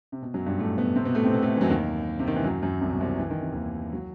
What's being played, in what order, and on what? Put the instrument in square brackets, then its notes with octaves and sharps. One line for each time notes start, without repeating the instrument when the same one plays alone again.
[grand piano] C3
B2
F#2 F#3
G2 G3
A2 A3
B2 B3
C3 C4
B2 B3
A2 A3
C3 C4
B2 B3
A2 A3
E3
F#2 F#3
D#2 D#3
C3
D#3
E3
F#2 F#3
F#2 F#3
C2 C3
B2
C2 C3
E3
D#3
C3
D#2 D#3
F#3